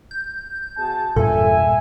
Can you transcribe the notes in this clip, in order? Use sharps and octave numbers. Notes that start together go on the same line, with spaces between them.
G6
B2 G#4 A5
E2 G2 A#2 A4 E5 G#5